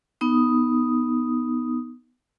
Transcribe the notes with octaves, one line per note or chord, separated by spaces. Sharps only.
B3 D#4 D#6